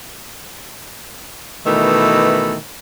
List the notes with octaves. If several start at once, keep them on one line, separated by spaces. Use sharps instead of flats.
B2 D#3 E3 A3